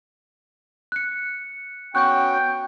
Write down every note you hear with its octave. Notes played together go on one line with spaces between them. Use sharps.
F#6 C#7
B3 C#4 F#4 G5 F#6 G6